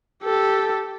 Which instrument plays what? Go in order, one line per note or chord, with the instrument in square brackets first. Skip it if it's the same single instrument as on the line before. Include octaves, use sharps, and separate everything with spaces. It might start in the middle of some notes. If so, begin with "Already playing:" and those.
[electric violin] G4 A4